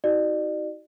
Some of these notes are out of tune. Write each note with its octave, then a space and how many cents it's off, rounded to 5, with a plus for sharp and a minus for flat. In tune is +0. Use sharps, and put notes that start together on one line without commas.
D#4 +40 F#4 +30 D5 +40